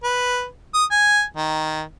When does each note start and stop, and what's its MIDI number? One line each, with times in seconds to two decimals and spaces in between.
0.04 0.46 71
0.74 0.85 87
0.91 1.23 80
1.36 1.83 51